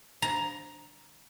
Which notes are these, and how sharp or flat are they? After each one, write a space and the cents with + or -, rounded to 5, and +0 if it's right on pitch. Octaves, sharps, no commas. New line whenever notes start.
A#5 +10